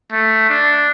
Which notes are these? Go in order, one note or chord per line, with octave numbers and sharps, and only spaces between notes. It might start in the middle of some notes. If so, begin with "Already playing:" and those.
A3
D4